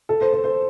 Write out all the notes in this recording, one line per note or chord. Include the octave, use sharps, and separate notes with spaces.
A4
C5
C5
C5